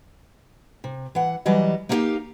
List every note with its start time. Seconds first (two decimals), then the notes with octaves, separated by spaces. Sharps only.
0.84 C3
1.15 E3 F#5
1.45 E3 F#3 G3 D#5
1.89 A#3 D#4 E4 G4 A#4 F5